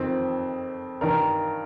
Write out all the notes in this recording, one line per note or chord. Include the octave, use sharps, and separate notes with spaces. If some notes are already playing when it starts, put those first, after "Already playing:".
Already playing: F2 D#3 C4
G2 D#3 A#4